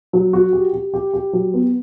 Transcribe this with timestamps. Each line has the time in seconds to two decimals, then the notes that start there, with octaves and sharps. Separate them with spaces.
0.13 F#3
0.33 F#4
0.53 G4
0.73 G4
0.94 G4
1.14 G4
1.33 F#3
1.54 B3